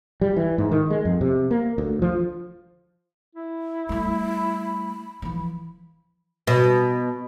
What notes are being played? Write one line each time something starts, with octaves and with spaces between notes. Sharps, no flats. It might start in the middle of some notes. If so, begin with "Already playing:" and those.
G3
E3
G#2
D#3
G#3
F2
C3
A#3
D2
F3
E4
G3 A3 B5
E3 F3
B2